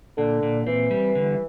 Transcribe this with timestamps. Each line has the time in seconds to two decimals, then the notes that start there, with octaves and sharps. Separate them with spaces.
0.18 A#2 D3
0.43 A#2
0.67 E3 C4
0.91 G3
1.15 D3